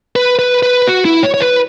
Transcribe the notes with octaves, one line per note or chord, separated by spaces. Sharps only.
B4
B4
B4
F#4
E4
C#5
C#5
B4